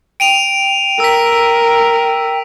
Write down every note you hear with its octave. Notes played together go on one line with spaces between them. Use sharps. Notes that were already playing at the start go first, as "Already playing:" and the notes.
G5 D7 D#7 F7
A#4 E6 B6